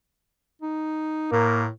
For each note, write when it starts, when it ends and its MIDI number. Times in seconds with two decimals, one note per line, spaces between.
0.62 1.28 63
1.32 1.69 45
1.32 1.63 58